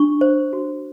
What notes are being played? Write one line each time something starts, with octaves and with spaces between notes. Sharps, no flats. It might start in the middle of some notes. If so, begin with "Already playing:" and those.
Already playing: D4 C#6
C5
F#4